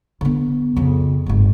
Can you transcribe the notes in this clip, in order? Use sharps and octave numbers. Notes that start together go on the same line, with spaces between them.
D3 B3
F2 C#3
G1 A2